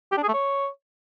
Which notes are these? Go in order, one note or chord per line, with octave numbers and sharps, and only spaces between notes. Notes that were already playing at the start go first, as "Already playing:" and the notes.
G4
D4
G#4
A3
C#5